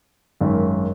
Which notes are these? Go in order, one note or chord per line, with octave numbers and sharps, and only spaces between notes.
G#1 F#2 D#3